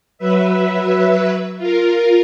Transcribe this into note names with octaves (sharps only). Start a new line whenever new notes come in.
F#3 B4 E5
F4 A#4